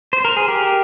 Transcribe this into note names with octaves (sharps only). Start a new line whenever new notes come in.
C5
A#4
G#4
G4 A#4